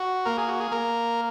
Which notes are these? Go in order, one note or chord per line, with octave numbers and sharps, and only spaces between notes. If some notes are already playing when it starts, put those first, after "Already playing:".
Already playing: F#4
A#3 A#4
G#4
F#4
G#4
A#3 A#4